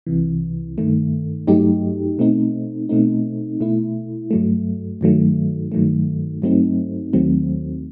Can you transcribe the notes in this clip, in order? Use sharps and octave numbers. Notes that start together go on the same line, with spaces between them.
C2 C3 E3
G2 D#3 A3
G2 F#3 A3 D#4 G4
B2 A3 C4 D#4
B2 A3 C4 D#4
B2 A3 E4
G2 F#3 A3
G2 D#3 F#3 A3
G2 D#3 F#3 A3
G2 F#3 A3 C4 D#4
D#2 D#3 F#3 A3 C4